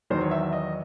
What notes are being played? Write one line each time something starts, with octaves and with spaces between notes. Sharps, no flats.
E2 D#3 F#3 C5
C#5
E5
E5
D#5